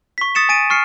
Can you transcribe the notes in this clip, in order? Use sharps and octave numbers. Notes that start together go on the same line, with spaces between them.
C#6 B6
D#6 A6 C#7 E7
G#5 A6 D7 D#7
C#6 F6 C7 C#7